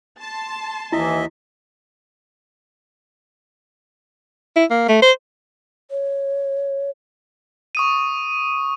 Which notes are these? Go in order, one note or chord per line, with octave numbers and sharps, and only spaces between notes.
A5 C6
D#2 E3 E4 D#5 E5
E4
A#3
A3
C5
C#5
C#6 D#6 D#7